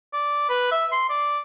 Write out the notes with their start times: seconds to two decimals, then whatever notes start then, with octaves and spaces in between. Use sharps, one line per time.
0.13 D5
0.50 B4
0.72 E5
0.92 C6
1.10 D5